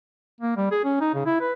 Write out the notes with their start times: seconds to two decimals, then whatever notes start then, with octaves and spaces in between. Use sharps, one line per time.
0.41 A#3
0.57 G3
0.71 G#4
0.84 C#4
1.01 D#4
1.15 C#3
1.26 E4
1.40 B4